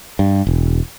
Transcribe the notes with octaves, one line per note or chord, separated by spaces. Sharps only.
G2
E1